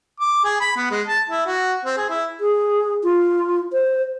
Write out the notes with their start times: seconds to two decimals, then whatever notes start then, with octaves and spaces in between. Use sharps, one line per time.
0.20 D6
0.44 G#4
0.61 B5
0.76 B3
0.91 G#3
1.07 A5
1.30 E4
1.46 F#4
1.85 C4
1.97 G#4
2.10 E4
2.40 G#4
3.04 F4
3.73 C5